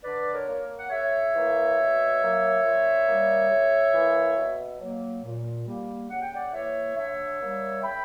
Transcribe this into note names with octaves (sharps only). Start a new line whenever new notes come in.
D3 B4 D5
A#4 C#5
A#3
F#5
C#3 C#5 E5
E3 A#3
B2
F#3 A#3
A#2
G3 A#3
C#3
E3 A#3
B2
F#3 A#3
A#2
G3 A#3
C#3 F#5
G5
D5 F#5
E3 A#3 C#5 E5
D3 C#5 E5
G3 A#3
C#3 G5 B5